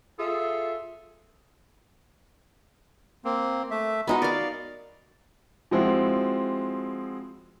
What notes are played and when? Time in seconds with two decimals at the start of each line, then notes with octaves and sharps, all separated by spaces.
0.19 F4 G#4 A4 E5
3.25 A#3 C4
3.71 A3 E5
4.07 G#3 B3 D#4 F#4
4.22 A#4 D5 F5
5.71 F3 G#3 C4 E4 F#4